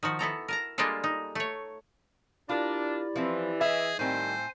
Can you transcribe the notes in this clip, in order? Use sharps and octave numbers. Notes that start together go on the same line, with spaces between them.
D#3 F3 F#4
B3 E4 A4 A#5
A#4 A5 A#5
G3 G#3 A#3 D4 F4 A4
D#4
A3 C#5
D4 E4 F4 G4 A#4 D5
E3 F3 C4
G#4 D#5 E5
A2 D#3 G3 C4 C5 G#5